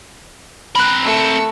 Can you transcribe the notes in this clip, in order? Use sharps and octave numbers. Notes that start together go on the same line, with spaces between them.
C4 A#4 B5 F#6
A3 E6 C#7